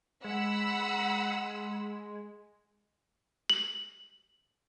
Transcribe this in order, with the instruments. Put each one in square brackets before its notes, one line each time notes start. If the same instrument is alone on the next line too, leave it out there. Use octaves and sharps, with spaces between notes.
[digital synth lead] G#3 [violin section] F#5 B5 E6
[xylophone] F#7